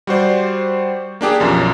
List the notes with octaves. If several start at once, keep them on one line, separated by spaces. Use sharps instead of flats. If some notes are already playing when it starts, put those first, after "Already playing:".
G3 F#4 C5 D5
A#3 D4 G4 G#4
B1 F#2 F3